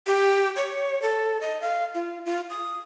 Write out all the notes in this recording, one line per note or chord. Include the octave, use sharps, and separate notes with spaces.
G4
C#5
A4
D#5
F5
F4
F4
D#6